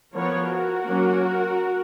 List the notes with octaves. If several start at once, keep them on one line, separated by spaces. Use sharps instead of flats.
F3 B3 A#4 C#5
F#4 A#4
F#3 A#3 C#4